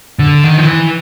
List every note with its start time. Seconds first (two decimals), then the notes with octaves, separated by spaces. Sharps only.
0.19 D3
0.44 D#3
0.57 F3
0.66 E3